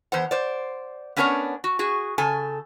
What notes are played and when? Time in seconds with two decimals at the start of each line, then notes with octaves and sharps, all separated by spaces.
0.12 E2 C5 F#5
0.31 C5 D5
1.17 B3 C#4 D4 A#4 C#5 F#5
1.64 F#4
1.79 F#4 G#4
2.18 C#3 A4 G#5